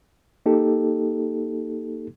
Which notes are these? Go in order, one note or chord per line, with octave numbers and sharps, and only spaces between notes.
A#3 D#4 G4 A4